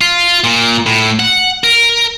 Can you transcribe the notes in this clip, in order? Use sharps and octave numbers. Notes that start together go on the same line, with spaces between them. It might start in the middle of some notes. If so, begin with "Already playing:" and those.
F4
A#2
A2
F#5
A#4